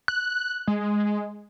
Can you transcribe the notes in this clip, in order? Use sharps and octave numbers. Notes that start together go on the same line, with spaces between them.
F#6
G#3